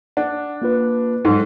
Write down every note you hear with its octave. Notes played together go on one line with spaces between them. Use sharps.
D4 F#5
A#3 F4 B4
G#2 F#3 D#4 A4